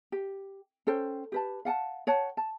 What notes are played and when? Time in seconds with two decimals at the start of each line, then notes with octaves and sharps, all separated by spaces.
0.12 G4
0.87 C#4 A4 C5 G5
1.32 G4 B4 A5
1.65 F5 F#5 G#5 A5
2.07 C#5 F#5 G5 A5
2.37 A5